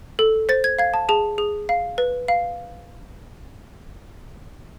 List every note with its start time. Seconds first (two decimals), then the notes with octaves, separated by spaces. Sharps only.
0.19 A4
0.49 C5 A6
0.64 G#6
0.79 F5 G#6
0.94 A5
1.09 G#4 A5
1.38 G#4
1.69 F5
1.98 B4
2.28 F5